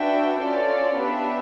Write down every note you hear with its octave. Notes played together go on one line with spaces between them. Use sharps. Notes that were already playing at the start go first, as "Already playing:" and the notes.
Already playing: D4 F#4 B4 E5 G5
C#4 F4 A4 D5
B3 D4 G4 B4 E5